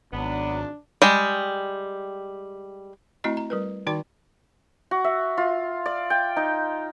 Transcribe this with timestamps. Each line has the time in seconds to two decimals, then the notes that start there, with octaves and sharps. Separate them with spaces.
0.13 G#1 F#3 B3 D4
1.02 G3 G#3
3.24 A3 C4 E4 F#4 D#5 A#5
3.37 A#5
3.50 G3 A#4 B4
3.87 D#3 D#4 F#4 D5 G5 D6
4.91 F#4
5.04 E5
5.38 F4
5.86 D5
6.10 G5
6.36 D#4